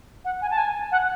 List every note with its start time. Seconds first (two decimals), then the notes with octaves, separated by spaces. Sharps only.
0.25 F#5
0.42 G#5
0.51 A5
0.58 G#5
0.92 F#5